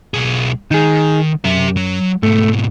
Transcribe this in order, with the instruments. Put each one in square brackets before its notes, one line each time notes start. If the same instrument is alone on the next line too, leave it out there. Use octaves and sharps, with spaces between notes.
[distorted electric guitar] B1 G#4
[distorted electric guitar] D#3 [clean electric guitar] D#4 G#4
[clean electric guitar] F#2 [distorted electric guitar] G4 E5
[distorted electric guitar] F#3
[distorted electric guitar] G#2 B2 [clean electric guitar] A3